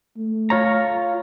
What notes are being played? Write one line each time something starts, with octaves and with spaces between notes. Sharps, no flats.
A3
F4 C#5 A#5